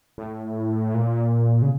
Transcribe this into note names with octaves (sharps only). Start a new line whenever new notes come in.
A2
A#2
C#3